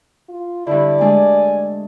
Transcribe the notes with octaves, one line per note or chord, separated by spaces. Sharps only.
F4
G2 D3 E4 D5
G#3 A3 D4 G#5